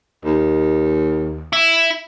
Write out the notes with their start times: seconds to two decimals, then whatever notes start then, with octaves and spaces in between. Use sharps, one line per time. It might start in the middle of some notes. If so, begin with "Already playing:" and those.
0.25 D#2
1.53 E4